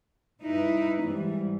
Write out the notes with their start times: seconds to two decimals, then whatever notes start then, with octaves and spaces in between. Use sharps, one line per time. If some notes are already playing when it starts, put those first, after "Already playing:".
0.42 G2 D#4 E4 B4
1.02 G#2 E3 G3